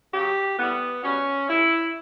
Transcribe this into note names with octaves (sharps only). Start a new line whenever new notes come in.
C#3 F#3 G4
A2 E3 G3 B3
B2 G3 C#4
A2 G3 E4